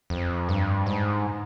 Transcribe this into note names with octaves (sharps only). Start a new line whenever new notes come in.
F2
G2
G#2